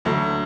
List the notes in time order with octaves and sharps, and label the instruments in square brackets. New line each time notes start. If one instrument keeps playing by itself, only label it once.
[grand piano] D2 D3 F#3